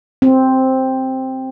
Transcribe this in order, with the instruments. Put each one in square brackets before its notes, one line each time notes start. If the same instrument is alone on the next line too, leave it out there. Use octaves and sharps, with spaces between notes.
[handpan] C4